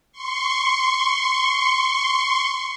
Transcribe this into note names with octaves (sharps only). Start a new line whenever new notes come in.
C6 C#6